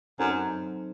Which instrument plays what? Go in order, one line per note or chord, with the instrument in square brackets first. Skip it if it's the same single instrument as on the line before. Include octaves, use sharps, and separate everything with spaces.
[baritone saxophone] F#2 [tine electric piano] F#3 C4 D#4 A4 C5